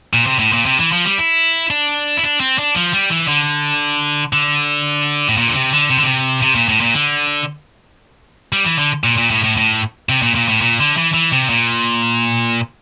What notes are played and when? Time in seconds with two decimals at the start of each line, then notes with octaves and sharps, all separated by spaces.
0.13 A#2
0.27 C3
0.39 A2
0.53 A#2
0.66 C3
0.79 E3
0.92 F3
1.05 G3
1.18 E4
1.71 D4
2.17 E4
2.23 D4
2.40 C4
2.58 D4
2.75 F3
2.93 G3
3.10 E3
3.28 D3
4.33 D3
5.28 A2
5.37 A#2
5.48 D3
5.55 C3
5.73 D3
5.90 C3
5.98 D3
6.04 C3
6.42 C3
6.55 A#2
6.69 A2
6.81 A#2
6.94 D3
8.53 G3
8.65 E3
8.79 D3
9.04 A#2
9.18 A#2
9.31 A2
9.44 A2
9.57 A2
10.09 C3
10.22 A#2
10.35 A#2
10.49 A2
10.62 A#2
10.80 D3
10.97 E3
11.14 E3
11.32 C3
11.49 A#2